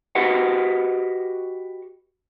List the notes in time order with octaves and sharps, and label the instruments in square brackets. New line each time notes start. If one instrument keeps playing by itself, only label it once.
[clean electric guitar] F#4 G4 B4 D#5 E5 F#5